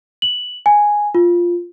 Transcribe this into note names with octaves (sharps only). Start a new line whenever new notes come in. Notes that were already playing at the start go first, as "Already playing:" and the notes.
F#7
G#5
F4